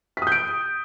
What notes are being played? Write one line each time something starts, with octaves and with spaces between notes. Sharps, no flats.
D#6 G6 B6 D7